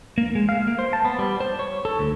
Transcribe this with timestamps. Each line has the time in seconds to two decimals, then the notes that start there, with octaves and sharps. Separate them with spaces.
0.18 A#3
0.35 G#3
0.49 F5
0.67 A#3
0.79 C5
0.93 A5
1.05 B3
1.19 G3
1.40 C5
1.59 C#5
1.85 A4
1.99 D2